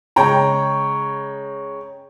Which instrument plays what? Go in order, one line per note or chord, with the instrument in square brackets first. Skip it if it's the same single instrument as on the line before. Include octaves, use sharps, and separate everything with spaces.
[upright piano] C#3 G#3 C#5 G5 A#5